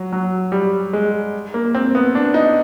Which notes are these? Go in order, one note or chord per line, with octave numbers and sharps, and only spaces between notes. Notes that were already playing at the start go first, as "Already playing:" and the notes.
Already playing: F#3
F#3
G3
G#3
A#3
C4
B3
D4
D#4